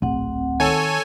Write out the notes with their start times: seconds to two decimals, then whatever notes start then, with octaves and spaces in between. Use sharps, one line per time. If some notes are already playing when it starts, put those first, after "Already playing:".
0.02 D1 A#1 C4 F#5
0.60 D#3 A4 C#5 G#5